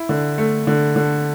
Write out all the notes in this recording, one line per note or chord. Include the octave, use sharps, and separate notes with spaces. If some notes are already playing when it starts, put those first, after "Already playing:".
Already playing: E4
D3
A3
D3
D3